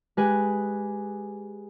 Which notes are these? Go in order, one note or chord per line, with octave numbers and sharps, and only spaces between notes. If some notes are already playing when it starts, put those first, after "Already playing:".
G#3 G4 B4 G#5 F#6